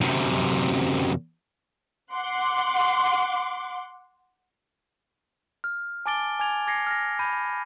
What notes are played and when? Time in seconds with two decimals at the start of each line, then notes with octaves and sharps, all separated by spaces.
0.01 F#2 C3
2.13 F#5 C6 D6
5.64 F6
6.06 G#5 A5 D6 A6 D7 G7
6.40 G#5 D6 G#6 F7
6.67 D6 G#6 A#6 C7 C#7
6.87 F6 A#6
7.19 B5 G6 D#7